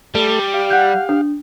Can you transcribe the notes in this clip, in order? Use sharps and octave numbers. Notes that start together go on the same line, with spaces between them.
G3 A3 A4
G4 F5
F#5 F#6 G6
D4